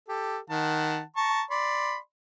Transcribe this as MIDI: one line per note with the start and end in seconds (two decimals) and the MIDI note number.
0.09 0.38 67
0.09 0.38 69
0.50 1.01 51
0.50 1.01 78
0.50 1.01 81
1.17 1.42 81
1.17 1.42 82
1.17 1.42 85
1.50 1.97 74
1.50 1.97 83
1.50 1.97 84